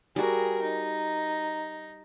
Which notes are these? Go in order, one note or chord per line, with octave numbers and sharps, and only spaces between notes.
G3 F#4 G#4 A#4
D#4